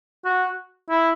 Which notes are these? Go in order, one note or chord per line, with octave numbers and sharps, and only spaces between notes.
F#4
E4